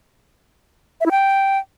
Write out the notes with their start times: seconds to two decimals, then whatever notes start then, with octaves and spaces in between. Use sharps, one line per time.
1.01 E5
1.06 E4
1.11 G5